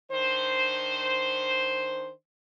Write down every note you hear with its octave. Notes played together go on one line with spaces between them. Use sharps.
D#3 D4 C5